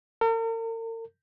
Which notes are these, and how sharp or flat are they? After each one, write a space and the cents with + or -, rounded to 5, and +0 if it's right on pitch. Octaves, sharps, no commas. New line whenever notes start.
A#4 -45